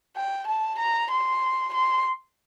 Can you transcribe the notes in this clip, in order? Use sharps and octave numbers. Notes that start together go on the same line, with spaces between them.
G5
A5
A#5
C6
C6